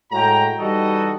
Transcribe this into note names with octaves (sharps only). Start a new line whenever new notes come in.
A2 G#3 F#4 G5 A#5
E3 G3 D#4 F#4 A4 D#5